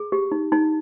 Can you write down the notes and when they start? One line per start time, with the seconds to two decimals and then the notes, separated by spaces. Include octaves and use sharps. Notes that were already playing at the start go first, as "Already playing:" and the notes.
Already playing: G#4
0.12 G4
0.32 D#4
0.52 D#4